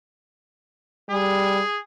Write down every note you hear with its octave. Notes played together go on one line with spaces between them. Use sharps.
G3 G#4